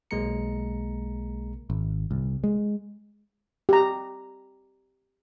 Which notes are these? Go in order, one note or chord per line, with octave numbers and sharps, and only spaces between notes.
B1 G#3 A#3 A#4 A#5 C#7
G#1
C2
G#3
G4 A#5